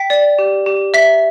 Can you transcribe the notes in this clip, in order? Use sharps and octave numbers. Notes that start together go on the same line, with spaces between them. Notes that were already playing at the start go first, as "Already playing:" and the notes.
Already playing: G5 B6
D5
G4
G4
E5 B6